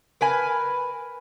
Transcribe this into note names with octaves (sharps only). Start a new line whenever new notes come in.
A#4 B4 G#5